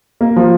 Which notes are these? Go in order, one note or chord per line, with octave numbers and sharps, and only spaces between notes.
A#3
F3